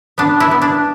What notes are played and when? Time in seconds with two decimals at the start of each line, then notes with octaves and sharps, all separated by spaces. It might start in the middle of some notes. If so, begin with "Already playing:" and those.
0.18 B3 D4
0.40 E4
0.51 B3
0.62 D4